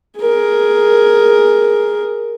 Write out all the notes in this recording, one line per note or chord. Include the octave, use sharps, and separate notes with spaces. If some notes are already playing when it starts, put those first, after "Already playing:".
G#4 A#4